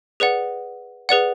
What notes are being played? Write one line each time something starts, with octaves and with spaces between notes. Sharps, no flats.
G#4 B4 D5 F#5
G#4 B4 D5 F#5